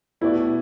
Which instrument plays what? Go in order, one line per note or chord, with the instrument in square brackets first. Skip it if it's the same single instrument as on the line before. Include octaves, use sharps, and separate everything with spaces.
[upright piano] B2 A3 G4 B4 D5 [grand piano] E4